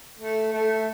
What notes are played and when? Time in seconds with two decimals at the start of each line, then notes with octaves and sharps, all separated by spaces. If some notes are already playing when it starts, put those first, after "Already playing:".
0.19 A3
0.52 A3